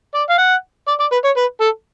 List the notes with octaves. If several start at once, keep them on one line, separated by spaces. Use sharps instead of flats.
D5
F5
F#5
D5
D5
B4
C#5
B4
A4